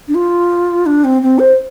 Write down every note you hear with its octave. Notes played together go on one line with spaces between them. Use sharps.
D4
F4
D4
C4
C4
C5